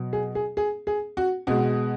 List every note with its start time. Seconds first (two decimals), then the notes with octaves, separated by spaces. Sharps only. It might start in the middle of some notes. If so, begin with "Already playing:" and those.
Already playing: B2 F#3
0.13 G#4
0.35 G#4
0.57 G#4
0.87 G#4
1.17 F#4
1.47 B2 G#3 F#4